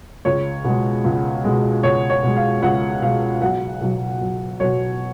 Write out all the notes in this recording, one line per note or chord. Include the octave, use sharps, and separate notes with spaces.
C#2 C#5
B2 G#3
C#2
B2 G#3
C#2 C#5
C#5
B2 G#3
F5
C#2 F#5
B2 G#3 F5
B1 F#5
B2 F#3
B1
B2 F#3 C#5